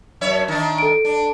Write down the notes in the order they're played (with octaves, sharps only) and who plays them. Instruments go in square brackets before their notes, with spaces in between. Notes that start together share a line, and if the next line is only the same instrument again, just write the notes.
[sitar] F#2 C#5 E5
D#3 D4
[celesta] A4 D7
[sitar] D4